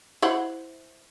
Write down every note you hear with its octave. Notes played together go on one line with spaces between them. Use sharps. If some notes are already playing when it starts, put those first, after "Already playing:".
E4 C5 F#5